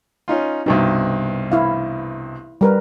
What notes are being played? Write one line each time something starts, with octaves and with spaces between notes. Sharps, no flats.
C#4 D#4 F4
C2 G2 B2 D#4
E4 F5
G3 A#4 B4